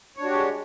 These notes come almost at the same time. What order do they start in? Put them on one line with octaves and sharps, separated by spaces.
C#5 D4 F#4 G4 G#3